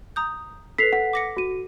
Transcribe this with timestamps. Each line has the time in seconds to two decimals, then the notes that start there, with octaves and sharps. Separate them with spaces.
0.16 A#5 D#6 G6
0.78 A4 B4 B6 C7 F7
0.92 F#5 B6
1.13 D6 A#6 C#7
1.37 F#4 D#7